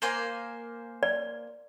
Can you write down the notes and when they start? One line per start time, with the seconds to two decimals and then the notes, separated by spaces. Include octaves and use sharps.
0.02 A#3 C5 G#5
1.03 D5